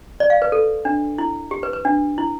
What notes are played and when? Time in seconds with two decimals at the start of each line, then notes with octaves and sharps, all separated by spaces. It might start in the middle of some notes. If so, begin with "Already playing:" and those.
0.20 D5
0.30 F5
0.42 B4
0.52 A4
0.85 D4
1.18 E4
1.51 G4
1.63 B4
1.73 B4
1.85 D4
2.18 E4